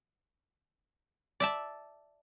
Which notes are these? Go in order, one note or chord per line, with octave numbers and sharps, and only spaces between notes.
D5 E5 A5